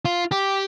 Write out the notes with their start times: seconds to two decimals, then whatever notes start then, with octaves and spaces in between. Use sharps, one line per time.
0.05 F4
0.32 G4